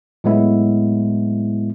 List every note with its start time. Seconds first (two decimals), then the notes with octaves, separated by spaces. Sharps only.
0.24 A2 F#3 G#3 B3 E4